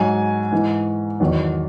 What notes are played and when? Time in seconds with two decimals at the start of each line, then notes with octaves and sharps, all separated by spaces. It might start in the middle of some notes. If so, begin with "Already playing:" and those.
Already playing: G#2 F#3 G#5
0.52 G#2 E3
1.20 E2 D#3 F#3